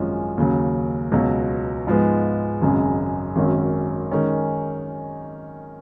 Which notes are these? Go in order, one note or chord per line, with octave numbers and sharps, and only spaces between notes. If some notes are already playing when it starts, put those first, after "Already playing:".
Already playing: G#1 F#2 F3 G#3 C#4
D#2 C#3 F#3
C#2 B2 F#3
G#2 F3 G#3 B3
G#1 F#2 C#3 G#3
G#1 F#2 D#3 F#3 C#4
D#3 G#3 C#4